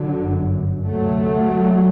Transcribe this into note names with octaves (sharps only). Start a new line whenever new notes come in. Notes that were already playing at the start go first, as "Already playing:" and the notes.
Already playing: D3 F#3
G1 F#2
D2 C3 F#3 A3